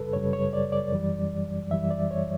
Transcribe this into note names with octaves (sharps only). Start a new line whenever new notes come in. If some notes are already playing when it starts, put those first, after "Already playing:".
Already playing: F#2 C#3 G3 A4 B4
F#2 C#3 G3 C#5
C#5
D5
D5
F#2 E3 G3
F#2 E3 G3 E5
D5
C#5